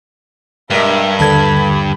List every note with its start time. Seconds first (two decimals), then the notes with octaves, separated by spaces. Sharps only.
0.70 G2 B2 G#3 A#4 E5
1.19 D#2 D3 A4 B4 A5 B5 G#6